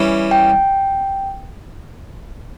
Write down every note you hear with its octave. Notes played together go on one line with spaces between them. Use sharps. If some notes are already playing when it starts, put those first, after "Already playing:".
Already playing: E3 G3 C#4
G5